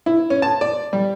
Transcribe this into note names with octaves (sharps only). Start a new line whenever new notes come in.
E4
C#4
A5
D5
G3